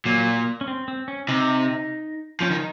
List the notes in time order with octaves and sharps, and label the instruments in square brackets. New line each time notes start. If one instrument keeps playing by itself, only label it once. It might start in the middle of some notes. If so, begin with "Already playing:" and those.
[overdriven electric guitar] A#2 [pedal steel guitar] F#3
[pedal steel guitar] C#4
C4
C4
C#4
[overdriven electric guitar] C3 [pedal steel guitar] D#4
[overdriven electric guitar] F3 [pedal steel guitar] C#4
[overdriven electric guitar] D#3 [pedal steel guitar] D#4